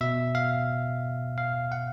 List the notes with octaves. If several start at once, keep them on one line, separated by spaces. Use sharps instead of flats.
B2 E5
F5
F5
F#5